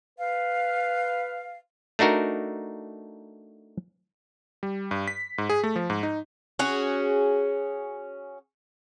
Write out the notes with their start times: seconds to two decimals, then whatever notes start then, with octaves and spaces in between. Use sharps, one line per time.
0.19 B4 F5
1.99 A3 D4 D#4 F#4 A#4
4.63 G3
4.91 G2
5.08 B6
5.38 G#2
5.49 G#4
5.64 A3
5.76 F3
5.90 G#2
6.03 D#4
6.59 C#4 F#4 G#4